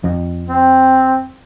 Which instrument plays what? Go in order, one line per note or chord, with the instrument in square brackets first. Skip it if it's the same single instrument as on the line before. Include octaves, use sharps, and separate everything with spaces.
[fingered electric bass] F2
[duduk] C4